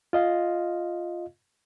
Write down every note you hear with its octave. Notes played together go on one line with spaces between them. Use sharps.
F4 D#5 F5